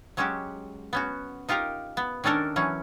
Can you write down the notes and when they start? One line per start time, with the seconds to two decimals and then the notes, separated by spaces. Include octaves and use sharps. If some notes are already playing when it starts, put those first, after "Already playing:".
0.17 F#3 G#3 C#4 F#4 G4
0.93 B3 C#4 F#4
1.49 D#4 F4 G4 A#4 A#5
1.97 B3
2.24 D#3 C#4 D4 A4 A#4
2.56 E3 F#3 C#4